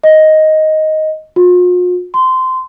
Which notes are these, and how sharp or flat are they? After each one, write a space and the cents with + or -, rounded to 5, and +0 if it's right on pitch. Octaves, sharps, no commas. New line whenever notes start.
D#5 +5
F4 +45
C6 -20